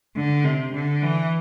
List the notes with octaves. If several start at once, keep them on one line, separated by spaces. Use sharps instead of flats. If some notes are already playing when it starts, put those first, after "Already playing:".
D3
C3
D3
E3